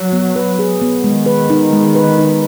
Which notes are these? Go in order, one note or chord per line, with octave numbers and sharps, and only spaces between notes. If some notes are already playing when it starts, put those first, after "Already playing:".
Already playing: F#3
B3
B4
G#4
B3
D#3 G#3
B4
D#4
G#3
B4
D#4